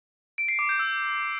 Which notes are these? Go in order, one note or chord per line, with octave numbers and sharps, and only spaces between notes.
D7
C7
D6
G6
E6